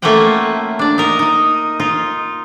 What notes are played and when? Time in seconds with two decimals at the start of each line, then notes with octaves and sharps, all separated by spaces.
0.02 A3 A#3 C#4 F4 F#5 G5
0.79 D4 D5
0.98 D#4 A#4 D#5
1.19 D#4 D#5
1.80 D#4 F4